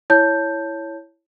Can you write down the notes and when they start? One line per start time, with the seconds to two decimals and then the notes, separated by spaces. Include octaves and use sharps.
0.10 E4 C#5 A5 G6